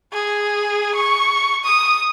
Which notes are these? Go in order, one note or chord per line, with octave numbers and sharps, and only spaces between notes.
G#4
C#6
D#6